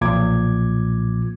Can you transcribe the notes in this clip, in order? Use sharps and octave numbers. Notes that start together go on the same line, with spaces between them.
B1 A#2 F3 D6 G#6